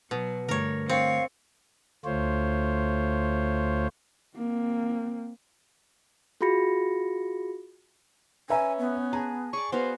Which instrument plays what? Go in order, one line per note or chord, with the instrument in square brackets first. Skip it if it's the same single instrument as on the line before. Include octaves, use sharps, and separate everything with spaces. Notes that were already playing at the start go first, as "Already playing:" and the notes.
[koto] B2 [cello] F#3
[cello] G2 [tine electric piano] D3 A3 A#6 [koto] A#4 C#5
[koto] C4 [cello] C#5 [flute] F5
[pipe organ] D2 A3 F4 C5 C#5
[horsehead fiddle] A#3 C4
[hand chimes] F4 F#4 G#4 B5 A#6 C#7
[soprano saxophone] C#4 [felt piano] B4 E5 A#5 [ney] G#5
[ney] B3
[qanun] G#4 [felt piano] A5 A#5
[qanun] G#4 D5 [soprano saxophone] C#6
[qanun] B3 F#4 F5 [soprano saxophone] C5